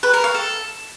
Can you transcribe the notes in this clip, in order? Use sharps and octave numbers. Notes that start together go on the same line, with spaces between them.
B4
A#4
F5
A4